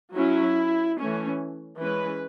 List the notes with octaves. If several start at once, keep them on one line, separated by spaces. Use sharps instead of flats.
F#3 C#4 E4
E3 A3 C#4
E3 G#3 C#4 B4